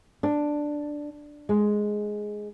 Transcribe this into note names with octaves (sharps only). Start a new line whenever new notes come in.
D4
G#3